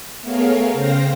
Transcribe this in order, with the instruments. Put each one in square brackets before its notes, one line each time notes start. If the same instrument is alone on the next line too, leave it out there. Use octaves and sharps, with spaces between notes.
[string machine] A3 B3 G#4 A#4 C#5 F5
C#3 C5 F5 G5 A#6